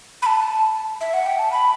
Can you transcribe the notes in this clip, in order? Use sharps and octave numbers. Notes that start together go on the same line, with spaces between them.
B5
A5
E5
F#5
G5
A5
B5